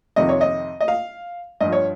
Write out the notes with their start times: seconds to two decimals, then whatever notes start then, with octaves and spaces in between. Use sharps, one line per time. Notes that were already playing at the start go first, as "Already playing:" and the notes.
0.16 F2 C3 D#3 D#5
0.29 C#5
0.41 D#5
0.81 D#5
0.88 F5
1.60 G2 F3 D#5
1.72 C#5